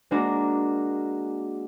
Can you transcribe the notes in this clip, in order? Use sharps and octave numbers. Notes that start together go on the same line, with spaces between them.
G#3 A#3 D4 F#4 A#4